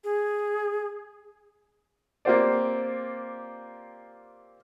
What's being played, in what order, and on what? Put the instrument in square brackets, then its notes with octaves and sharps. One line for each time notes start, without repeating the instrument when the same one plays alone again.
[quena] G#4
[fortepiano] A#3 C4 F4 G4 C5 D5